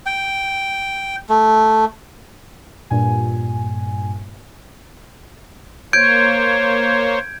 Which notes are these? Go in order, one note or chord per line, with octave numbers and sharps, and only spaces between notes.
G5
A3
G2 A#2 G#5
A#3 C5 C#5 G6 G#6 D7